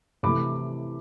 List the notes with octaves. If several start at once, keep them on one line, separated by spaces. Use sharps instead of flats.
C3 E3 A3 B5 D6